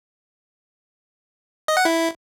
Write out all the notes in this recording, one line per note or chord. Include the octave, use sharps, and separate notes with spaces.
D#5
F#5
E4